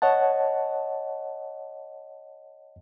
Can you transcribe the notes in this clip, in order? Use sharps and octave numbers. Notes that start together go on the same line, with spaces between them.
C#5 D#5 F#5 A5